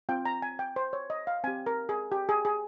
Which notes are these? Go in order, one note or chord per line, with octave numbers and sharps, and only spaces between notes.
C4 F4 G5
A#5
G#5
G5
C5
C#5
D#5
F5
C4 G4 G#5
A#4
G#4
G4
G#4
G#4